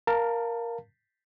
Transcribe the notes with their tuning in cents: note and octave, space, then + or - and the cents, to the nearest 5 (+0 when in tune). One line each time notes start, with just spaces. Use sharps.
A#4 +5 F5 +0 A5 +25